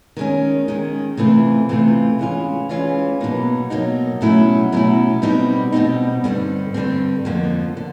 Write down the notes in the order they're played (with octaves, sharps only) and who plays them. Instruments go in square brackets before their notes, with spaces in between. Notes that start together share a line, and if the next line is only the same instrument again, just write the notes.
[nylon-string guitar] D#3 G#3 C#4
D#3 G#3 C#4
C3 E3 A3 C4 F4
C3 E3 A3 C4 F4
E3 G#3 C#4 F4
E3 G#3 C#4 F4
B2 F#3 A#3 D#4
B2 F#3 A#3 D#4
B2 F#3 A3 C#4 E4
B2 F#3 A3 C#4 E4
B2 G3 C4 D#4
B2 G3 C4 D#4
G2 D3 G3 C4
G2 D3 G3 C4
F2 D3 F3 A#3
D3